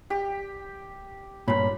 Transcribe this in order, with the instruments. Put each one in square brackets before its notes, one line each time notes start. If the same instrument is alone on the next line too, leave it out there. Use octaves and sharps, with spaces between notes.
[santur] G4
[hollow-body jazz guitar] G2 A#2 [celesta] C#5 [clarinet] B5